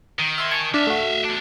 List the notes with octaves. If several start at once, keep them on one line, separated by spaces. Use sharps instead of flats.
D#3
E5 C6 G#6
G#5 A5 C#6
D4 E5 F5
A3 F#4
E2 D4